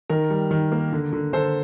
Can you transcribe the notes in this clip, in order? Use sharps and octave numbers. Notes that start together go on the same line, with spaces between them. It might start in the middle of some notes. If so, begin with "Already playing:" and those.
D#3 A#4
G3
D#3
A#3
D3
D3
D3 A4 C5